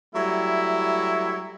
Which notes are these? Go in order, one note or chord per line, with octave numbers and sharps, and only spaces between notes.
F#3 G3 A3 E4